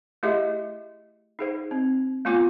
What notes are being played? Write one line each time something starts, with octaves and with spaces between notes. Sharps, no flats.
A3 E4 G4 G#4 D#5 E5
D#4 G#4 C5
C4
A3 B3 F4 G#5 D6